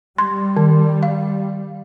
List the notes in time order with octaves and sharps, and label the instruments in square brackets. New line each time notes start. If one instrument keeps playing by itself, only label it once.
[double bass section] G3 [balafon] C6
[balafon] D#3
F5